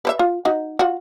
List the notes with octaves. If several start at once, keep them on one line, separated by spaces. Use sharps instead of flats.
B4 C5 E5
F4
D#4 F#4
F4 F#4